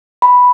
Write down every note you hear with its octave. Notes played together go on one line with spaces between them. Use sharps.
B5